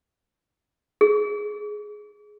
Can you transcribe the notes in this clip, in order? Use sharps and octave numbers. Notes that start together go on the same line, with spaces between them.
G#4